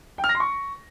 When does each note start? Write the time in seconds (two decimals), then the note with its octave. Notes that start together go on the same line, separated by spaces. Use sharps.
0.18 G5
0.24 F6
0.29 A#6
0.35 C6
0.40 C#6